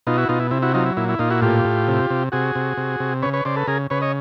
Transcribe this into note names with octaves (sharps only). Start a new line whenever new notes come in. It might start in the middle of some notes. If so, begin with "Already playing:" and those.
B2 D#4 F4
E4 F#4
B2 D#4 F4
E4
C3 E4
E4 F#4
F#3 D#4 F4
E4
A#2 E4
E4
A#2 D#4 F4
E4 F#4
A2 F4 G4
A2
C3
C3
C3 F#4 G#4
C3
C3
C3
C#3 B4 C#5
B4 C#5
C#3 C5 D5
A4 B4
C#3 G#4 A#4
C#3 B4 C#5
C#5 D#5